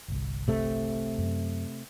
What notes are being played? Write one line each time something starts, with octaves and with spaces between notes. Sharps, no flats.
G1 C2
C3 A3
F#2 F#3